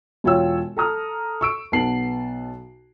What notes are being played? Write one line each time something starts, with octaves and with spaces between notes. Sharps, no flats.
E1 F4 C#5 G5 E6
A4 A#5 D#6 F6
C#6 E6 D7
B1 B3 A5 C7 F#7